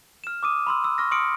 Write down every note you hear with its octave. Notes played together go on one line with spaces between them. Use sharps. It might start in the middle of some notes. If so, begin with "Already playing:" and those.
F6 E7
D6 D#6 D#7
B5 C6 E6
E6
C#6 F6 A#6
C6 D#6 F6 C#7 D7